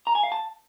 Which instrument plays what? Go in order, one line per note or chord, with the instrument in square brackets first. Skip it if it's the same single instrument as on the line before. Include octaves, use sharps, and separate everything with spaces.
[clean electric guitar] A#5
G#5
F5
A5